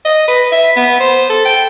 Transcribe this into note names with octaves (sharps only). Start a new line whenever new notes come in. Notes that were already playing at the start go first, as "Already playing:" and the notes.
D#5
B4
E5
B3
C5
A4
G5